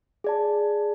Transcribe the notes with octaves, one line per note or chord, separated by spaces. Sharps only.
G#4 D5 A5